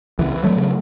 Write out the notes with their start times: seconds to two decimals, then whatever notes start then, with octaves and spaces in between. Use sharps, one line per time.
0.19 C#2 E3
0.44 F#3 A3
0.57 C#3